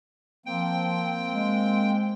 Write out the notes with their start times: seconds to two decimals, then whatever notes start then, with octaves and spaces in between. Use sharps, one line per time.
0.46 F3 A#3 C4 G5
1.30 G#3